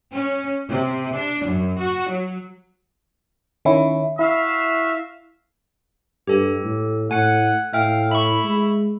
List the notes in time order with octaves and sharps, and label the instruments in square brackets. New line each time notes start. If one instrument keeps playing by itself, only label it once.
[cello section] C#4
C3
D4
F#2
F#4
F#3
[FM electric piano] D#3 C#4 E4
[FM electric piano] E4 [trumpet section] F#4 E5 F5
[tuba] G2 [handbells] G4 A4
[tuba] A2
[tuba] A2 [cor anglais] F#5 [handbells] G#5 C#7
[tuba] A2 [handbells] E5 G5 [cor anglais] F5
[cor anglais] E4 [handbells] B5 C#6
[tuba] G#3